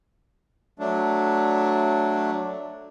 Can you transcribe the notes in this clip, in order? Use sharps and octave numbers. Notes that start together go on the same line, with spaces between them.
F#3 A3 D4